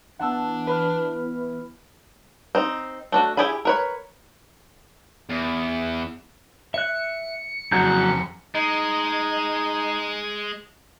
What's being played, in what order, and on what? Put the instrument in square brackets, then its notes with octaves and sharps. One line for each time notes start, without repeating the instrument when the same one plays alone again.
[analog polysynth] E3 B3 E4 [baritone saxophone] D4 [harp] F#5 A5 E6
[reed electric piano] B4 B5 F6
[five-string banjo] C4 D#4
A3 D4 F#4
E4 G4 G#4 G#5 B5
A#4 B4 C#5
[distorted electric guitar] E2
[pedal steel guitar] E5 F#6 [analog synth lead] C#7
[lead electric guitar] F2 A#5 [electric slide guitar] C#3 F#3 F#4 [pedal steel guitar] F#6 G6
[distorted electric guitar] G#3 [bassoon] D#4